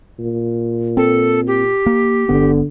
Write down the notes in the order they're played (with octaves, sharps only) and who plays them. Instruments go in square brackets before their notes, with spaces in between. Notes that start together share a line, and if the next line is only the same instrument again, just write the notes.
[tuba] A#2
[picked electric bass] C4 [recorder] A4
[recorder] G4
[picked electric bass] A#3
[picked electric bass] G1 B3 [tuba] D3